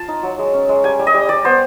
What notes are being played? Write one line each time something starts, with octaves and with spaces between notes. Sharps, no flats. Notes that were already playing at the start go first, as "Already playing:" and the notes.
Already playing: F4 A5
D#4
F#3
G#3
C#4
G#3
G3 G#5
G3
D#5
G3
G3 D5
B3 C5